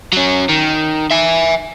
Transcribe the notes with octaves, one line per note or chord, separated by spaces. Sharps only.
F#3 C#4
D#3
E5 G#5